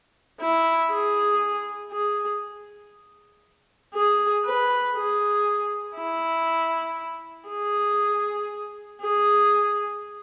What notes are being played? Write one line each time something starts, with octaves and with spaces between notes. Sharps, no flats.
E4
G#4
G#4
G#4
B4
G#4
E4
G#4
G#4